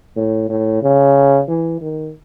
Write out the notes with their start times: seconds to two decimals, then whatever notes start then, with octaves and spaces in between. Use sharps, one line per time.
0.16 A2
0.49 A2
0.82 C#3
1.48 E3
1.81 D#3